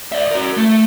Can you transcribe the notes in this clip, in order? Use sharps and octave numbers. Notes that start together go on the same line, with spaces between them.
D5 E5
F#4 A#4
A3